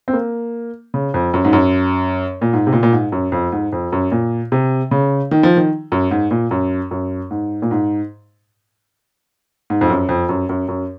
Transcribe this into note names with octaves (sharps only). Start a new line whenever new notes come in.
C4
A#3
C#3
F2
F#2
G#2
F#2
A#2
G#2
C3
A#2
A#2
G#2
F#2
F2
G#2
F2
F#2
A#2
C3
C#3
D#3
F3
D#3
F#2
G#2
A#2
F#2
F#2
G#2
A#2
G#2
G#2
F2
F#2
F2
F#2
F#2
F#2